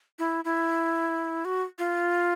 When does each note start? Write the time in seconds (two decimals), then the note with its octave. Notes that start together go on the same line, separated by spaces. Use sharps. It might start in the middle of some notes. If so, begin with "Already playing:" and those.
0.19 E4
0.45 E4
1.45 F#4
1.79 F4